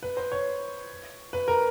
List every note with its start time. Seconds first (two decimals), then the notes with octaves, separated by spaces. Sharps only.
0.03 B4
0.17 C5
0.32 C#5
1.33 B4
1.48 A#4